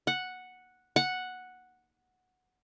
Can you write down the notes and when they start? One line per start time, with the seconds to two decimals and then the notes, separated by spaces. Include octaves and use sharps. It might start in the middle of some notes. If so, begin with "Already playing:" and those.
0.07 F#5
0.96 F#5